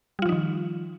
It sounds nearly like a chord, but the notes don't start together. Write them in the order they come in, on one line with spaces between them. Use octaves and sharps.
G3 F4 F3 D#4 D#3